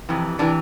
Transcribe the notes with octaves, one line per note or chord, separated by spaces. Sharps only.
F2 C3 E3
C3 E3 D4